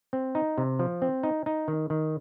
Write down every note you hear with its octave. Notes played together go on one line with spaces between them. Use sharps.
C4
D#4
C3
F3
C4
D#4
D#4
D#3
D#3